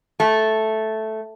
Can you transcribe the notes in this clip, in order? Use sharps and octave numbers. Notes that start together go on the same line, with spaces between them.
A3